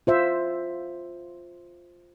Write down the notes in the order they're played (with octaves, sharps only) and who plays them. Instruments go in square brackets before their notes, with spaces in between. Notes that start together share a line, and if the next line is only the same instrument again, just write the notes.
[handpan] F4 C5 E5